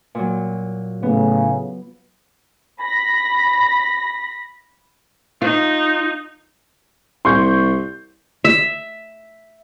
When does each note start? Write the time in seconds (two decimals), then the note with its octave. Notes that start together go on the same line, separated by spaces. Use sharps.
0.15 A#2 F#3
1.03 A2 C#3 B3
2.81 B5 A#6
5.42 D#4 F4
7.25 C2 C6 C#6 G6
8.44 E5